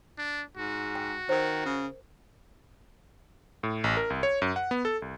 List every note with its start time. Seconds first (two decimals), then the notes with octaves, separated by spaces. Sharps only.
0.18 D4
0.57 G#2 F#4
0.95 G5
1.29 D#3 A#4 C5
1.66 C#3
3.63 A2
3.84 A1
3.97 A#4
4.10 C2
4.23 C#5
4.42 F#2
4.56 F#5
4.71 B3
4.85 A4
5.02 C2